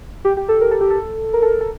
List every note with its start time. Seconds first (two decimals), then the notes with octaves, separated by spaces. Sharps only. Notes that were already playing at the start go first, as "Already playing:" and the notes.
0.25 G4
0.37 G4
0.49 A4
0.61 A#4
0.71 A4
0.81 G4
0.91 A4
1.33 A#4
1.42 A4
1.61 A4